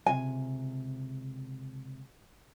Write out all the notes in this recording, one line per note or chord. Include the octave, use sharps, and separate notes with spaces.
C#2 C3 G#5